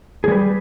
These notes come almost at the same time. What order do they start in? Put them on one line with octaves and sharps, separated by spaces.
G#4 G3 B4